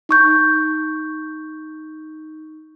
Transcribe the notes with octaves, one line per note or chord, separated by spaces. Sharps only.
D#4 C#6 G6